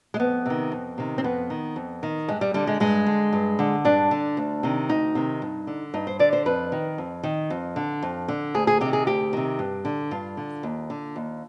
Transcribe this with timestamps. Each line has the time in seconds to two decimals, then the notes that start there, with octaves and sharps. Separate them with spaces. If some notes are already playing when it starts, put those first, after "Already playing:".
0.14 G#3
0.20 F2 B3
0.46 C3 D#3
0.72 F2
0.98 C3 D#3
1.18 C4
1.24 F2 B3
1.50 D#3
1.76 F2
2.03 D#3
2.28 G2 G#3
2.41 G3
2.54 D3 G3
2.67 G#3
2.80 G2 G#3
3.06 D3
3.33 G2
3.59 D3
3.85 G2 D4
4.11 D3
4.37 D2
4.63 C3 D#3
4.89 D2 D#4
5.15 C3 D#3
5.42 G2
5.67 D3
5.94 G2 D#4
6.07 C5
6.19 D3 D5
6.33 C5
6.46 F2 B4
6.72 D#3
6.98 F2
7.23 D#3
7.50 F2
7.76 D3
8.02 F2
8.28 D3
8.54 D2 G#4
8.67 G#4
8.81 C3 D#3 G4
8.93 G#4
9.07 D2 G4
9.33 C3 D#3
9.59 G2
9.85 D3
10.11 G2 F4
10.37 D3
10.63 D#2
10.90 D3
11.16 D#2